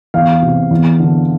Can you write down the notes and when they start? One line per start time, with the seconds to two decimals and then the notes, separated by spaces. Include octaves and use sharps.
0.14 E2 F5
0.42 C3
0.71 E2
1.00 D3